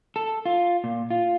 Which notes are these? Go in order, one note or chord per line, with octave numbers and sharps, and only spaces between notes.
A4
F4
A#2
F4